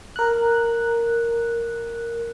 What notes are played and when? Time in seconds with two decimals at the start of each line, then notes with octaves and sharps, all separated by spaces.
0.16 A#4 F#6